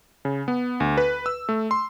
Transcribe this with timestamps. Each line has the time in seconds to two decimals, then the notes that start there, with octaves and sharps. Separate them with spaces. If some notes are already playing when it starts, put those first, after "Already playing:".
0.25 C#3
0.48 B3
0.80 D2
0.97 B4
1.26 E6
1.49 A3
1.71 C6